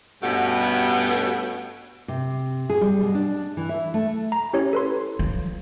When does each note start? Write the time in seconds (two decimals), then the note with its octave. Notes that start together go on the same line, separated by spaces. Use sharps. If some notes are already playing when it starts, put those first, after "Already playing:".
0.23 G2 B2 A3 C#4 G4 F#5
2.08 C3
2.70 G#4
2.81 G3
3.01 B2
3.15 D4
3.57 E3
3.69 E5
3.94 A3
4.32 A#5
4.53 C#4 E4 G4 C#5
4.73 A4 B4 C6
5.19 F3